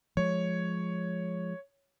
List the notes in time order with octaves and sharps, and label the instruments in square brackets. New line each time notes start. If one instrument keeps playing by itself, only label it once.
[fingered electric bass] F3 G#3 [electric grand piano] C#5